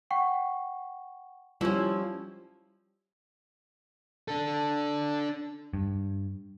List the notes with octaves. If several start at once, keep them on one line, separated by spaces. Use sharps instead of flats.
F#5 G5 C#6
F3 G3 C#4 E4
D4 A4
G2